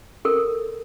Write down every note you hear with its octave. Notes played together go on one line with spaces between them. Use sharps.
A4 A#4